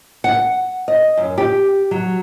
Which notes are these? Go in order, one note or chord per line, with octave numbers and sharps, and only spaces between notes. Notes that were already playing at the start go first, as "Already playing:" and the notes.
F#5
D#5
F#2
G4
F#3